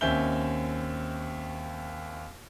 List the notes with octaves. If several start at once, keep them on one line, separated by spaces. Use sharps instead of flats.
D#2 C4 C#4 E5 G6 G7